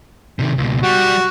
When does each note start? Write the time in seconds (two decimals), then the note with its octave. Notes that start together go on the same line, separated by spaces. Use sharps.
0.39 C3 D#3
0.58 C#2 B2
0.83 G3 F#4